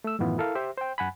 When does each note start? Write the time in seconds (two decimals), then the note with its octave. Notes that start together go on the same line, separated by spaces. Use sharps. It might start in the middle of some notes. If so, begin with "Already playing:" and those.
0.04 A3 E6
0.19 F#2 A2 D#3 E3 B3 F4
0.38 E4 A4 A#4 F5
0.55 G4 C5 E5
0.78 C5 G5
0.98 F#2 F#5 G#5 B5